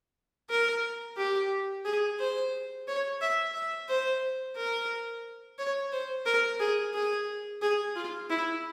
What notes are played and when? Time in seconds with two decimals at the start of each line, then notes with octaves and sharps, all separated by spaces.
0.50 A#4
1.17 G4
1.85 G#4
2.19 C5
2.87 C#5
3.21 E5
3.54 E5
3.89 C5
4.56 A#4
5.58 C#5
5.92 C5
6.26 A#4
6.60 G#4
6.94 G#4
7.62 G#4
7.96 F4
8.30 E4